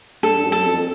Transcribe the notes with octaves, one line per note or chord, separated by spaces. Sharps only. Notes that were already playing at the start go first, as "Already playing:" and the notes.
G2 A4
G2
F#2
A4
F2